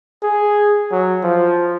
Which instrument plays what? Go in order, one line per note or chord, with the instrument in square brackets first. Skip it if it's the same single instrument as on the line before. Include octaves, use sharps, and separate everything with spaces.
[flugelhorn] G#4
F#3
F3